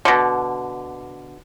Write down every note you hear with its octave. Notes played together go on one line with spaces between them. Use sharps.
B2 D3